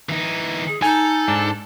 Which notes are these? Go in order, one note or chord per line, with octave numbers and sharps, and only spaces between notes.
E3 D#4
G#4
D#4 A4 G#5
G#2 D4